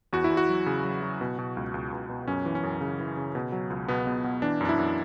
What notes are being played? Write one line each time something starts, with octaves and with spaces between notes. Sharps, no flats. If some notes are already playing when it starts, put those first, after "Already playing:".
E2 F#4
E4
E2
F#4
F#3
C#3
F#3
F#3
B2
B2
C#2
C#2
C#2
B2
F#2 C#4
E3
C#4
F#2
C#3
E3
C#3
B2
F#3
C#2
B2 B3
B2
B2
E3 D4
F#2 D4
E4
F#2